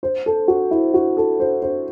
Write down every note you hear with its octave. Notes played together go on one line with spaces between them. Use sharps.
C5
A4
F#4
E4
F#4
A4
C5
C5